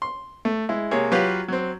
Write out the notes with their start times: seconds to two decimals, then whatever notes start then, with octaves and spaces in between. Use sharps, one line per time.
0.02 C6
0.45 A3
0.69 G#3 E4
0.91 C3 A#3 G#4 C#5
1.12 F#3 F4 G4 B4 F5
1.48 F#3 C4